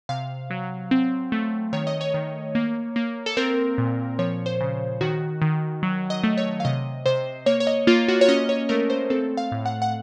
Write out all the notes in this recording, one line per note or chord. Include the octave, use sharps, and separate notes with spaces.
C3 F5
F#3
C4
A3
D#3 C#5
D#5
C#5
D#3
A#3
A#3
A4
C4 A#4
A#2
F3 C#5
C5
C#3
D#3 F#4
D#3
F#3
D#5
A3
C#5
F5
C3 D#5
C3 C5
A#3 C#5
C#5
D#5
A#3 F4
F#4
C#5
C#4 D#5
C#5
A3 A#4
C5
C4 A4
F5
A2
F#5
F#5